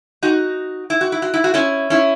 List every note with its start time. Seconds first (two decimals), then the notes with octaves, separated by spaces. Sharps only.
0.23 D#4 F#4
0.90 E4
1.01 F#4
1.12 E4
1.22 F#4
1.34 E4
1.44 F#4
1.54 C#4 E4
1.90 C#4 E4